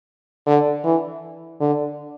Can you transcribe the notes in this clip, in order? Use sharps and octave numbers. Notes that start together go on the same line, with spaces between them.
D3
E3
D3